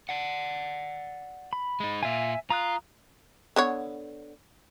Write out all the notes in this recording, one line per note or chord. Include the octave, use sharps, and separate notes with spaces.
D5 F#5
B5
G#3 D#4
A#2 F4 E5 G#5
F4 A#5 D#6 F#6
D3 B3 C#5